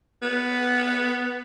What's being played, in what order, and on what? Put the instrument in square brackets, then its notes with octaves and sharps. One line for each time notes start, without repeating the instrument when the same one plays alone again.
[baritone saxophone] B3